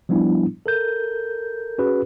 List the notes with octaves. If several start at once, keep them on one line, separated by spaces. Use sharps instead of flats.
F3 G3 B3 D4 E4
A4 A#4 G6
C#4 F#4 G#4 B4